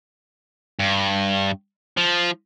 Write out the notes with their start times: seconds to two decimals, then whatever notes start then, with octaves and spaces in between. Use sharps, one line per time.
0.79 G2
1.97 F3